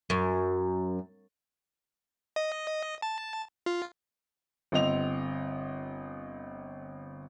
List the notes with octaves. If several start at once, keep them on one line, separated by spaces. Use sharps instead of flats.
F#2
D#5
A5
F4
G1 C4 D#5 F7